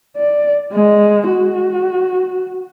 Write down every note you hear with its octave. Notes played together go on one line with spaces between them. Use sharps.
D5
G#3
F#4